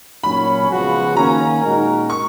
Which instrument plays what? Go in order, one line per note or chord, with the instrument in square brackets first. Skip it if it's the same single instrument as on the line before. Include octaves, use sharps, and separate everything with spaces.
[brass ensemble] A#2 F#3 C#4 [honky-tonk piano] B5
[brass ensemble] C#2 C#3 F3 B3 F#4
[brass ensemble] D#3 A#3 C#4 [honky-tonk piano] A#5
[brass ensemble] A#2 G#3 D#4 F#4 A#4
[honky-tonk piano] C#6